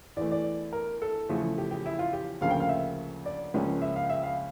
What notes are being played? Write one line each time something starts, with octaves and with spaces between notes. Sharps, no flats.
E2 E3 A3 D5
D5
A#4
A4
E2 C#3 F3 A3
G4
G4
E4
F4
G4
D2 C#3 F3 A#3 C#4 F5
G5
F5
E5
D5
C#2 C#3 F3 A#3 C#4
E5
F5
E5
F5